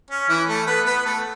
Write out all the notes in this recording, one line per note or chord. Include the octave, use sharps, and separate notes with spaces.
C#4
E3 E4
A3 A4
B3 B4
B3 B4
B4
A3 A4